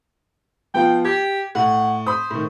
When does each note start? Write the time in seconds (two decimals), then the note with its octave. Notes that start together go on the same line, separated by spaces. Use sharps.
0.74 F3 B3 F4 G5
1.05 G4 G#6
1.55 A2 F#5
2.06 C5 B5 D#6
2.30 A2 D#3